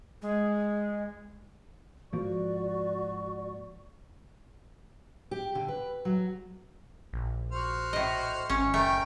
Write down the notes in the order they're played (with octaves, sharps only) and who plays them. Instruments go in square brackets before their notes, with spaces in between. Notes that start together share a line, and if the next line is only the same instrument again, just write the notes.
[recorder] G#3
[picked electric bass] G#2 F3 A#3 [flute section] F#4 D5 C#6
[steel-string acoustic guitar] G4
D3
B4
F#3
[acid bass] A#1
[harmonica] F#4 C5 F6
[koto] A2 D#5
[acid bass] G#1 [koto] C#4
[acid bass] F#1 [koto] A3 [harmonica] A#4 G5